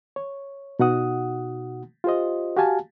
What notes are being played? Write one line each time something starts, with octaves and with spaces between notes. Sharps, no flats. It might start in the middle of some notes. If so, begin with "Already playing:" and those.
C#5
B2 D#4 F#4 F#5 D#6
F4 G4 C5 D#5
F#4 G4 F5 G#5 A5